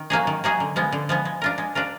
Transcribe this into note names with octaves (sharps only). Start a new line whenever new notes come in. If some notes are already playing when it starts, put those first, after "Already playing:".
Already playing: D#3
F#3 A#3 D#4 G#4
D#3
F#3 A#3 D#4 G#4
D3
F3 G#3 B3
D3
F3 G#3 B3
G#3
D4 F4 A#4
G#3
D4 F4 A#4